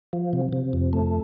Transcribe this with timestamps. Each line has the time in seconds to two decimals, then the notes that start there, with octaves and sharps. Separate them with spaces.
0.13 F3
0.33 C3
0.53 C3
0.73 F2
0.93 A3